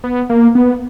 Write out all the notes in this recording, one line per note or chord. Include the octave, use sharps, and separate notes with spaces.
B3
A#3
B3